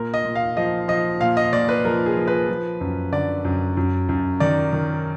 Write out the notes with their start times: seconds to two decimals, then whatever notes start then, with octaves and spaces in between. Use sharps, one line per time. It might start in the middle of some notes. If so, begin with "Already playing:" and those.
Already playing: A#2 A#4
0.14 D#5
0.25 A#2
0.35 F5
0.57 F3 D#5
0.88 F3 D#5
1.20 A#2 F5
1.37 D#5
1.53 A#2 D5
1.69 B4
1.85 F3 A#4
2.06 G#4
2.16 F3
2.27 B4
2.48 F3
2.81 F#2
3.12 D3 D5
3.45 F#2
3.77 F#2
4.09 F#2
4.40 D#3 D5
4.72 D#3